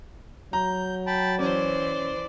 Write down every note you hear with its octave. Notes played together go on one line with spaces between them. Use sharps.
F#3 A#5 G6
G5 A5 B5
E3 C#4 C5 D5